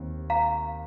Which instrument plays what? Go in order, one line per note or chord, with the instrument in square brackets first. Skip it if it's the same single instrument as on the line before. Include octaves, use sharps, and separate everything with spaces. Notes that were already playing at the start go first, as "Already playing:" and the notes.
Already playing: [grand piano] D#2 D#3 C4
[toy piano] F5 A#5